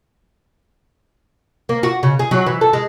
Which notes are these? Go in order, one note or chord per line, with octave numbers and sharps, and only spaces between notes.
A#3
F#4
C#3
G#4
F#3
E3
A4
G#3